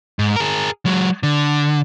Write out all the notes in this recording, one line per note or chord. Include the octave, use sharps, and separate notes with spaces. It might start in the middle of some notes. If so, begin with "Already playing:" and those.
G#2
G#4 A#4
F#3 G#3
D3